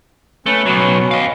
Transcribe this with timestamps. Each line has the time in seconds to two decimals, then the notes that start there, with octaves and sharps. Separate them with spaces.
0.46 A3 C#4 B4
0.66 B2 F#3
1.11 D#5 F5